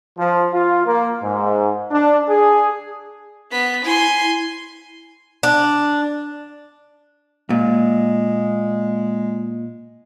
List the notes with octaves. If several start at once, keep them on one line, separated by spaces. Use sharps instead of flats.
F3
F4
A#3
G#2
D4
G#4
B3 B6
E4 G#5 C6
D4
A#2 G#3